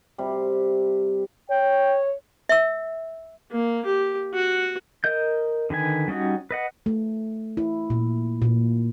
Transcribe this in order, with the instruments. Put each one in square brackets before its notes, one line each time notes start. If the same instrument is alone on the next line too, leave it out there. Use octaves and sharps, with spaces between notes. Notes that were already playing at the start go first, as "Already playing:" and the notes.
[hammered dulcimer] C3 G3
[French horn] C#5 [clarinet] G5
[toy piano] E5 E6
[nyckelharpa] A#3
G4
F#4
[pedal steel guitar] A#4 D#5 G6
D3 D#3 B4 G#5
G3 C#4 D#4 F#4
B4 D#5 F#5
[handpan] A3
E4
A#2
A#2